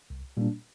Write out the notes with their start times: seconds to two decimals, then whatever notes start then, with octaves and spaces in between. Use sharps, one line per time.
0.10 C2
0.37 A#2 G3 A#3 D4